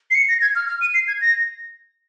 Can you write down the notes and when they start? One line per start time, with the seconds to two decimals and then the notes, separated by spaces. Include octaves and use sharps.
0.11 C7
0.15 C#7
0.29 A#6
0.42 G#6
0.55 F6
0.68 F6
0.81 D#7
0.94 C7
1.08 G#6
1.21 A#6